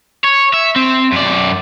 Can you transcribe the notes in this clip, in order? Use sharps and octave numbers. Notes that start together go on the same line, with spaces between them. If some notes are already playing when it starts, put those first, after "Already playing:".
C#5
E5
C4
F#2 D5